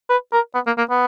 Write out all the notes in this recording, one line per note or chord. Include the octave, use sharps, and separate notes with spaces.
B4
A#4
B3
A#3
A#3
B3